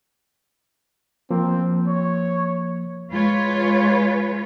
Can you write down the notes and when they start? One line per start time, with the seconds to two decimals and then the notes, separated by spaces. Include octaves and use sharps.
1.31 F3 A#3 C4
1.88 C#5
3.11 G#3 F4 B4 C#5